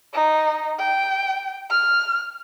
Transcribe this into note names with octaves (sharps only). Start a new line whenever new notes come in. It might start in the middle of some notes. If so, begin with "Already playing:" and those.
D#4
G5
F6